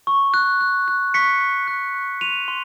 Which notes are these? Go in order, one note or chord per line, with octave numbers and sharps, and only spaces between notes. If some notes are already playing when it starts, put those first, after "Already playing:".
C#6
F#6
F#6
F#6
C#6 B6 C#7
C#6
F#6
C#6
C6 D#7 F7
C6